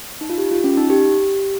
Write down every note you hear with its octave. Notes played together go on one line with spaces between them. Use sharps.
D#4
F4
G4
F4
C#4
D#4
G4